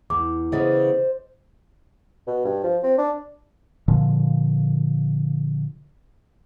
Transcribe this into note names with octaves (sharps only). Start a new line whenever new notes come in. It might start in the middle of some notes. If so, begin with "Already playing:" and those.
E2 D6
C#3 E3 B3 A4 C5 D#5
B2
G2
F3
C4
D4
A#2 D3 F3